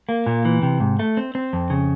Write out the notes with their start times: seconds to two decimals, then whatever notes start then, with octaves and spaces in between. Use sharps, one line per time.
0.09 A#3
0.27 A#2
0.45 E3
0.63 C3
0.80 G#2
0.99 A3
1.17 C4
1.35 C4
1.53 F2
1.70 C#3